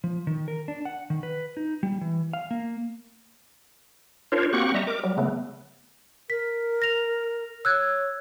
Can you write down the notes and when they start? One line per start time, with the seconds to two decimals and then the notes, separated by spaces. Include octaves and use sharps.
0.04 F3
0.27 D#3
0.48 A#4
0.68 D4
0.85 F#5
1.10 D#3
1.23 B4
1.57 D#4
1.83 G3
2.01 E3
2.33 F5
2.51 A#3
4.32 D4 F4 A#4 C5 C#5
4.53 A#3 C4 F#4 G4 F#5 C#6
4.74 G3 D#5 E5 A#5
4.87 A#4 D6
5.03 F#3 G3
5.18 C#3 A3 B3
6.30 A#4 B6
6.82 A#6 F7
7.65 C#5 E6 F#6 G#6